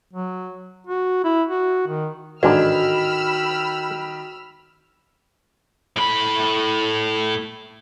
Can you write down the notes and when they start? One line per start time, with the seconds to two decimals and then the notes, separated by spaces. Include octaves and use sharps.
0.13 F#3
0.87 F#4
1.24 E4
1.48 F#4
1.88 D#3
2.43 A1 G#2 D3 D#3 F#4 B5 E6 F6
5.97 A2 B5